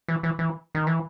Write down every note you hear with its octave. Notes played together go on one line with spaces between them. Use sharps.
E3
E3
E3
D#3
E3